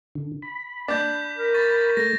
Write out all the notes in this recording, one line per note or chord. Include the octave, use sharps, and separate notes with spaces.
D3
B5
D4 D6 G6
A#4
C#6 A6
A3 A#6